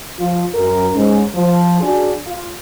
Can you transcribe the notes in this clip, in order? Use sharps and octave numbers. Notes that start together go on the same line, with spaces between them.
F3 F4
F#2 A#4
G#2 C#4
F3
D4 F#4 G#4
F4